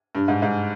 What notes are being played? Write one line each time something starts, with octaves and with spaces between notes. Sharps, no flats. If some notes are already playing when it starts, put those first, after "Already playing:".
G2
G#2
G#2